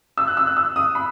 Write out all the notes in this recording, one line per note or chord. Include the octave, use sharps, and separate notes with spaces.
E6
F#6
E6
F#6
E6
D#6
B5